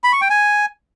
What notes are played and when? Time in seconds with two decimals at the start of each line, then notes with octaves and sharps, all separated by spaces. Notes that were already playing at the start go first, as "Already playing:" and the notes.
0.04 B5
0.12 C#6
0.21 G5
0.30 G#5